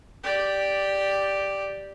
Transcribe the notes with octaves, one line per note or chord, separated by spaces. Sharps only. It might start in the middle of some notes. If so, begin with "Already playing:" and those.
G4 D5